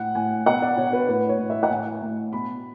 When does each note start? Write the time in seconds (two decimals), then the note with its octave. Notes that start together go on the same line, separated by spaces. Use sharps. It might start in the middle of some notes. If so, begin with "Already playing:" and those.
Already playing: A2 F#5
0.15 A2 G#5
0.46 B2 F#5
0.62 D5
0.77 B2 C#5
0.93 B4
1.08 A2 B4
1.29 C#5
1.39 A2
1.50 E5
1.63 F#5
1.70 A2 G#5
2.02 A2
2.33 B2 B5